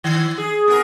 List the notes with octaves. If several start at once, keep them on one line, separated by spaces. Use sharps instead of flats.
D#3
G#4
B3 G#4 A#4